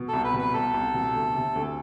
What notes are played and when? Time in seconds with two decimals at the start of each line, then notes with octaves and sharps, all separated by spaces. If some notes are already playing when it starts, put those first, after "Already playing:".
Already playing: B2
0.08 C2 A4
0.24 B4
0.34 B2 B4
0.53 C2 A4
0.74 C2
0.94 B2
1.15 D2
1.34 C3
1.55 D2